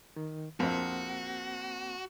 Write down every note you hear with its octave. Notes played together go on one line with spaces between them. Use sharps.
D#3
A#1 F2 A#3 C4 F#4